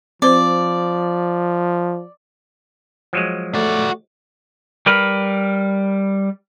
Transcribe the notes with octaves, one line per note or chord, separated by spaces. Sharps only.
F3 C4 C5 D5
F3 F#3 G#3
A3 F#4 D5
G3 A#4 B4